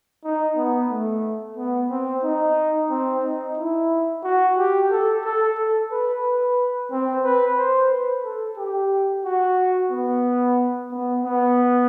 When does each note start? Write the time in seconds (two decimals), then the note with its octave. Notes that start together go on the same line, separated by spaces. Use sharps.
0.24 D#4
0.57 B3
0.90 A3
1.57 B3
1.90 C4
2.24 D#4
2.90 C4
3.24 D#4
3.57 E4
4.24 F#4
4.58 G4
4.91 A4
5.25 A4
5.58 A4
5.91 B4
6.24 B4
6.91 C4
7.24 B4
7.57 C5
7.90 B4
8.24 A4
8.58 G4
9.25 F#4
9.91 B3
10.91 B3
11.24 B3